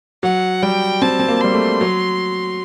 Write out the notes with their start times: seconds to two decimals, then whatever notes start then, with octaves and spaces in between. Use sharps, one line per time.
0.23 F#3 F#5
0.63 G3 G5
1.02 C4 A5
1.20 C4
1.28 A#3
1.41 G3 C6
1.54 A3
1.81 F#3